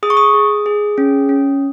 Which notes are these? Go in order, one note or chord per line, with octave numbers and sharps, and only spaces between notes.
G#4 D#6
C#6
D#6
G#4
G#4
C#4
C#4